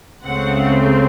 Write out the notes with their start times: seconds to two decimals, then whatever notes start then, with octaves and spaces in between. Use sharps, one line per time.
0.24 C#2 C#3 A3 C4 F#5